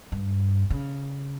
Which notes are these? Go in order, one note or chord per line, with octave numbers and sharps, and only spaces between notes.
G2
C#3